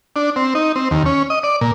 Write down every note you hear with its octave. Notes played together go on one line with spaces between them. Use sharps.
D4
C4
D#4
C4
D#2
C#4
D#5
D5
A#2